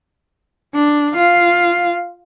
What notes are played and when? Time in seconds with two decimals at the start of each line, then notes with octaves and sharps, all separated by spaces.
0.74 D4
1.14 F4 F5